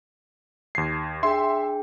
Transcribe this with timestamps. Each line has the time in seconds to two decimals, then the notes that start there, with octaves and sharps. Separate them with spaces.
0.75 D#2 G#6 C7
1.23 D4 G#4 E5 G5 C6